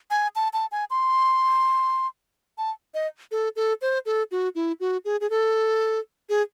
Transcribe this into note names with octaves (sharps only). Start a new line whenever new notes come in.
G#5
A5
A5
G#5
C6
A5
D#5
A4
A4
C5
A4
F#4
E4
F#4
G#4
G#4
A4
G#4